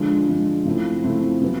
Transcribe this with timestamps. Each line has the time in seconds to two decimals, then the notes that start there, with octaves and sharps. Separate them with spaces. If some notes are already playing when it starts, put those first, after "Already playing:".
Already playing: D3 F3 G#3
0.28 D3 F3 G#3
0.65 C#3 F3 A3 C4 E4
1.04 C#3 F3 A3 C4 E4
1.41 C#3 F#3 B3